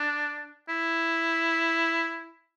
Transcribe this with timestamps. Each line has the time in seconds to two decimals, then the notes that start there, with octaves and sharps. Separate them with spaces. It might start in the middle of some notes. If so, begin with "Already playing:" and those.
Already playing: D4
0.69 E4